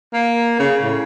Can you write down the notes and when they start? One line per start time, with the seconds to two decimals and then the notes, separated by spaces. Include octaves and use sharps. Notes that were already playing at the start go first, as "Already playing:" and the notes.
0.13 A#3
0.59 C#3
0.83 A2